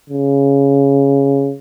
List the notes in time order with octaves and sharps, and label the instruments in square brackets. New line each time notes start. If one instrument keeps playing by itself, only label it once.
[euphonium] C#3